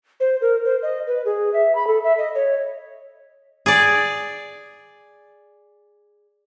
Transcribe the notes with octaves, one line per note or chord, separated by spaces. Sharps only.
C5
A#4
C5
D#5
B4
G#4
E5
B5
A4
E5
D#5
C#5
G#4 D5